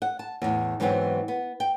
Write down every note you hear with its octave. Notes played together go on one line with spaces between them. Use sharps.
F#5
A5
E2 A2
G#2 E3 F#3 G3 B3 C4
B3
G5